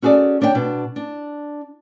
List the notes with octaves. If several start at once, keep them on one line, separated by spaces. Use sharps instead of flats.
C#4 F#4 G#4 A4 D5
D#2 D4 C#5 E5 G5
B2 D4
D4